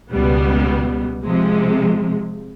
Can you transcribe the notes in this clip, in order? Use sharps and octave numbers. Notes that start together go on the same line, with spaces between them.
C#2 B2 G3 B3
C3 F3 G#3